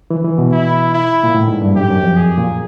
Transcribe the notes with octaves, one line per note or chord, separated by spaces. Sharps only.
E3
E3
B2
E4
E4
A#2
A2
G#2
G2
F#2 G4
F#2
F2
G#4
A#2